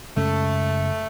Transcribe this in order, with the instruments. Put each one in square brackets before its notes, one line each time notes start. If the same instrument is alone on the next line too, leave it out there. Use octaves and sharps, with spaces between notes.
[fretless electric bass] F#2 C#3 G#3 C#4 [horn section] A3